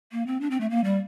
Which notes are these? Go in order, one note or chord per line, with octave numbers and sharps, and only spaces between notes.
A#3
C4
D4
C4
A3
A#3
G3